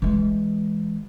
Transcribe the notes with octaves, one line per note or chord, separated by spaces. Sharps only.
E3 G#3